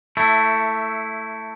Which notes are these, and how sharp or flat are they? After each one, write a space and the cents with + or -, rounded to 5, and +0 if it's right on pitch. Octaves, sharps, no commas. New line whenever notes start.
A3 +15 E4 +0